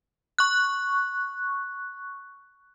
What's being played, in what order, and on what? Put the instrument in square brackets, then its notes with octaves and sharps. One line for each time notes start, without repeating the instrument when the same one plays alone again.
[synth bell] C#6 F#6